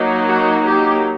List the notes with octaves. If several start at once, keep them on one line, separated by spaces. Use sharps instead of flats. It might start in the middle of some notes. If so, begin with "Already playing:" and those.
Already playing: F#3 A#3 D#4
F#4
G4